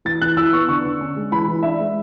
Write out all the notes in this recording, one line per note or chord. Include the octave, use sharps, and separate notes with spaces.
E3 A6
E3 F#6
E4 E6
B3 C#6
D3 C#6
D3
C#4
G#3
E3 B5
E3
D4 E5
G#3